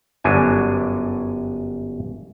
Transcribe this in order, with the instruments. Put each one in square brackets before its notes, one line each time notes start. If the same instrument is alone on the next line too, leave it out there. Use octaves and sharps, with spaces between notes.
[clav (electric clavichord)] G1 F#2 D4 G#5